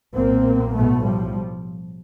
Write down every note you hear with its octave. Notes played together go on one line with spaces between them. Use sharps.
B1 A#2 A#3 C4
B1 A2 A3 B3
F3 G3